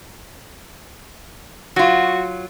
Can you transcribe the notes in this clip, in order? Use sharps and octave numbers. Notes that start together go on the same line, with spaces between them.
F#3 F4 F#4